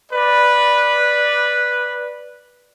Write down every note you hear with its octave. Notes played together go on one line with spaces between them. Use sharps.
B4 D5